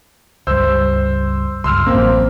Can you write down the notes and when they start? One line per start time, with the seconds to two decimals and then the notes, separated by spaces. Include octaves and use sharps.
0.47 C#2 G2 G3 C5 E6
1.64 C#2 G2 C6 E6 F6
1.86 A1 F#2 A#3 C4